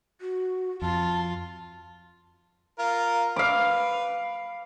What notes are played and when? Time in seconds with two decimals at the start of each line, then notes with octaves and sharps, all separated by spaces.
0.21 F#4
0.82 F2 F4 A5
2.79 F4 A#4
3.36 B4 F5 D6